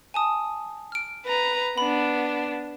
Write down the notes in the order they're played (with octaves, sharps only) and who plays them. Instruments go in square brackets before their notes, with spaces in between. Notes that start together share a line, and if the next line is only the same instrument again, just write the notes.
[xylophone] G#5 A5 D#6
F6 D7
[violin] B4 A#5
[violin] B3 D4 [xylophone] B5